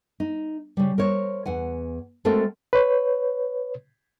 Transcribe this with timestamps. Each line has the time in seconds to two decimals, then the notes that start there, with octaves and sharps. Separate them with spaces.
0.20 D#4
0.77 C#3 G3
0.98 A#4 C5 C#5
1.46 E2 F#5 G#5
2.25 G#3 A3 C4 F#4 A4 A#4
2.73 B4 C#5